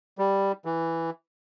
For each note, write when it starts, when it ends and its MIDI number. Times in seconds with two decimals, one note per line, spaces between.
0.18 0.52 55
0.65 1.10 52